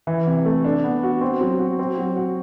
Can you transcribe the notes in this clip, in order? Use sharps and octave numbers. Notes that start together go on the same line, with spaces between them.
E3
C3
A3
D4
B3
F#4
C4
F#3
F#4
C4
F#3
F#4